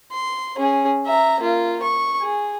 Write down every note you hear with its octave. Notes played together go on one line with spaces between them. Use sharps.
C6
C#4 G#4
E5 A#5
A#3 F4
C#6
G#4